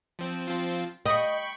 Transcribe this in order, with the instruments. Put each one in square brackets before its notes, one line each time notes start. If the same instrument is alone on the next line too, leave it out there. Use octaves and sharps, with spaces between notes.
[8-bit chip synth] F3 C4
F3 C4 F4
[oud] D#5 [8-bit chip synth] G5 B5 C#6